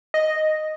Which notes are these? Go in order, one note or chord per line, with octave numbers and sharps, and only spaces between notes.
D#5